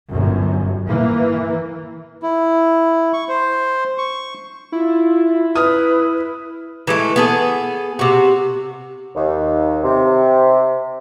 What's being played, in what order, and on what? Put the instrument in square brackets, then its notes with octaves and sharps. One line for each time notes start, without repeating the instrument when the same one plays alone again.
[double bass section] G1 F#2
E3 A#3
[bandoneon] E4
C#6
C5
C#6
[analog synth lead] E4 [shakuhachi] F4
[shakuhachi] B4 [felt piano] D#6 F6
[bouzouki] E3 G#3 A3
B3 G#4 A4
C3 F#4
[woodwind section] D#2
C3